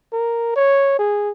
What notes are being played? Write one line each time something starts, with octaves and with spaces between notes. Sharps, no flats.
A#4
C#5
G#4